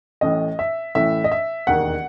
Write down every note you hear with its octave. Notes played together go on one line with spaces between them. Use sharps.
A1 A2 E3 D#5
E5
A1 A2 E3 E5
D#5
E5
E1 D#2 D#3 F#5